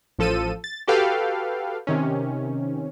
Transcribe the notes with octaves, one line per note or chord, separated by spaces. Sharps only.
A1 F3 A4 E6 D#7
A6
F#4 G4 A4 B4 F5 G5
C3 D#3 C#4